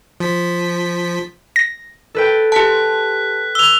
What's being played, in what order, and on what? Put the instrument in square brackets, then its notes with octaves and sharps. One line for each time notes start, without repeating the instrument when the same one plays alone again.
[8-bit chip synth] F3 B6
[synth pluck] A#6
[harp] A4 B4 G5
[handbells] G4 A5 [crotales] F#6 B6
[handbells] E6 [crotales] F7 G7